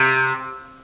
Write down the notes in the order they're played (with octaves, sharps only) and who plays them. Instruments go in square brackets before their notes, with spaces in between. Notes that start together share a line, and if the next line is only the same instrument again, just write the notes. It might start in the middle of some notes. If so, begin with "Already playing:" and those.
Already playing: [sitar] C3